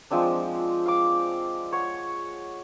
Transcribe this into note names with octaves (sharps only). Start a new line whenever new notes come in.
F3 G#3 C4 D4
F5 D6
C#5 F#5